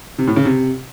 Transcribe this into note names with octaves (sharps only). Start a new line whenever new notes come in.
C3
A2
C#3
C3